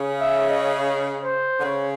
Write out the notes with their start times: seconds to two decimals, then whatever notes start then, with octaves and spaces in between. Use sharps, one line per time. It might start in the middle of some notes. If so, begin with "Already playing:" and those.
Already playing: C#3
0.20 E5
0.49 D#5
1.20 C5
1.59 D3
1.64 C#3 C#5